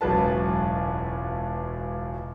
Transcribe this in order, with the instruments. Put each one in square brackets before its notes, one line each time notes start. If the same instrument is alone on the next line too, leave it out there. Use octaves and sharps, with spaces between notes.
[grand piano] E1 C#2 F#2 F#3 B4 A5